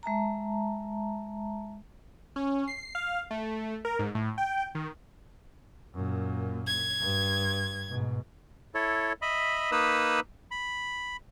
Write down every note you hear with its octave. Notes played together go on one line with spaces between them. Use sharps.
G#3 E5 A5 A#5
C#4
C7
F5
A3
A#4
G#2
A2
G5
D#3
F#2 A#2
G#6
G2
G#2 B2
E4 A4 C#5
D#5 E5 B5
A#3 D#4 B4 B5 D#6 E6
B5